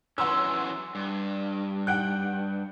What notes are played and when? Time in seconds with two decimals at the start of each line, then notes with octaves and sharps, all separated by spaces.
0.18 E3 F#3 C#4 F#5 C6 E6
0.95 G2
1.87 F#5 G5 F#6